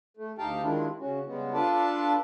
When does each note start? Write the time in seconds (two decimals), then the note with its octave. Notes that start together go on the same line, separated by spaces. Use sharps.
0.17 A3
0.38 D2 D#4 G4 F5 G5 A5
0.62 D#3 G3 G#3 D4 E4 F4
0.99 C#3 C#4 F#4
1.26 C#3 G3 G#3 B3
1.53 D4 F4 A4 B4 D5 A5